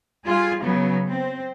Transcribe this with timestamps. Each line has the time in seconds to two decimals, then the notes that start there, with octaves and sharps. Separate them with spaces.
0.25 G3 F4 G#4
0.61 C#3 F#3 B3
1.08 C4